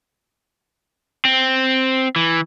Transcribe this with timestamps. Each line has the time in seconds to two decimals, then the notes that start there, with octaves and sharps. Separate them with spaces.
1.25 C4
2.16 E3